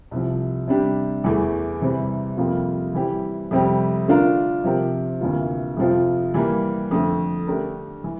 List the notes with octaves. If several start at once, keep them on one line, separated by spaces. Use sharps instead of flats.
C2 C3 F3
C3 G3 D4 G4
E2 E3 A3
C3 E3 G3 C4
F2 C3 G3 A#3 F4
E3 G3 C4 E4 G4
F2 C3 G3 C4 G4
D3 A3 D4 F4 A#4
C3 F3 C4 G4 A#4
D2 C3 E3 A#3 F4
F2 C3 F3 C4 F4
E3 G3 A#3
F2 D3 A3
D3 A3 D4 G4 A#4
E3